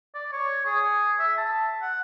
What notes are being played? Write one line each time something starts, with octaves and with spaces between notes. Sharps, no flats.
D5
C#5
G#4
E5
A5
F#5